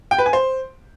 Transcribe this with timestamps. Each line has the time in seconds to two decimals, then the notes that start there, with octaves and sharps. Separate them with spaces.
0.11 G5
0.18 B4
0.26 G#5
0.33 C5